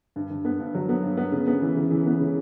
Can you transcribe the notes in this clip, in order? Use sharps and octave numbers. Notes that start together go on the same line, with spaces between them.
G2
G2
B3
G2
F#3
B3
G2
B3
C#3
B3
E3
C#3
E3
B3
C#3